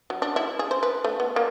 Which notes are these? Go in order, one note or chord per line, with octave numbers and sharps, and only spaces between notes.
F#3
D4
E4
G#4
C5
B4
A3
B3
A#3